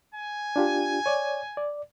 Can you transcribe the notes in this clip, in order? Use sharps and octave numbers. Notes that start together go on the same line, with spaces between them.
G#5
D4 F4 G4
C#5 D5
D5